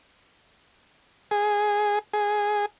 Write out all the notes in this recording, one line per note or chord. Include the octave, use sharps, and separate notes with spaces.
G#4
G#4